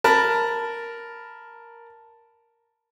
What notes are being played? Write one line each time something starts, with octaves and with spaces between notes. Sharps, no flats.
A#4 A5 B5